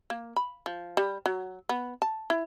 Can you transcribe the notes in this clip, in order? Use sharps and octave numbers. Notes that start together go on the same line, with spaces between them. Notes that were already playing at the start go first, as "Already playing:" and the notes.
A#3
B5
F3
G3
F#3
B3
A5
E4